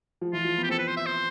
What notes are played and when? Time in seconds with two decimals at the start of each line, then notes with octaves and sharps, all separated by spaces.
0.21 F3
0.33 E3 F4
0.45 F3
0.58 B3
0.63 G4
0.69 C4 A4
0.79 B4
0.88 C5
0.97 E5
1.06 C5